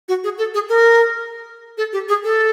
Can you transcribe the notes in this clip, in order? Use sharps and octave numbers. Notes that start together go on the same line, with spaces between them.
F#4
G#4
A4
G#4
A#4
A4
G4
G#4
A4